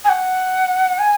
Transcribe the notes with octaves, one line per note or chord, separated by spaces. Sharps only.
G#5
F#5
G#5